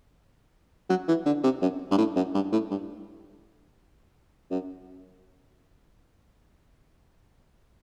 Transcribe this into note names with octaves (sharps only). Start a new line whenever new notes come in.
F#3
E3
D3
C3
F#2
G2
A2
F#2
G2
A2
G2
F#2